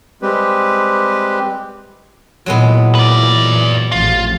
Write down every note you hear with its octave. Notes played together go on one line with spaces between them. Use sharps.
G3 G#3 C4 G4 B4
A#2 E3 F#3 G#3 B3
B4 D5
A1 F2 F4